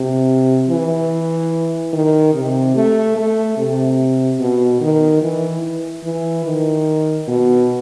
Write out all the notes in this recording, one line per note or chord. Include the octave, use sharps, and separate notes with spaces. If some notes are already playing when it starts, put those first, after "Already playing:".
Already playing: C3
E3
D#3
C3
A3
A3
C3
B2
D#3
E3
E3
D#3
B2